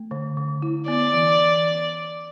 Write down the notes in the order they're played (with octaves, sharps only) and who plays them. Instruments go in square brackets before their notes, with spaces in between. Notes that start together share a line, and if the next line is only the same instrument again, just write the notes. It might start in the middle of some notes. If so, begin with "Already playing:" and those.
Already playing: [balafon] A3
D3
D3
E4
[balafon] B3 [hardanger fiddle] D5
[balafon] E3